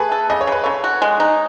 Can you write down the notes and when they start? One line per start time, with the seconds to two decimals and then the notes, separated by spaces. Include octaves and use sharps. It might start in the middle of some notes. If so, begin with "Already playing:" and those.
Already playing: A3 G#4 B4
0.12 A4
0.30 C#3 D#5
0.41 C#5
0.47 C#3 B4
0.64 C#3 A4 C#5
0.84 F#4
1.02 G#3
1.20 D#4